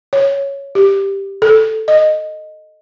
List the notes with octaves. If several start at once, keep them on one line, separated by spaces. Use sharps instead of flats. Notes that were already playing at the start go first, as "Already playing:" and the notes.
C#5
G4
A4
D#5